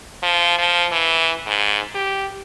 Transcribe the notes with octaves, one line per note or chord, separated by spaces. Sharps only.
F3
F3
E3
G#2
G4